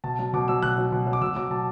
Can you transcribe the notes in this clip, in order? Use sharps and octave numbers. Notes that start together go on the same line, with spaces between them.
B2 A5
F#3
B2 D6
F#3 E6
B2 F#6
F#3
B2
F#3
D6
B2 E6
F#3 D6
B2 A5